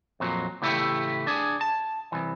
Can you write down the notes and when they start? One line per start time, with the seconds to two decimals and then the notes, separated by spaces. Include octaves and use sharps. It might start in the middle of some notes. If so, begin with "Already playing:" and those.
0.20 F2 A#2 F#3
0.62 A2 C#3 E3 A3 E4 G4
1.27 D4 G#4
1.61 A5
2.12 C2 E3